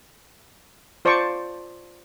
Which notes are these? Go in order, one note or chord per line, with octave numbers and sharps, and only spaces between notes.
F4 C5 D5 A5 C#6 D6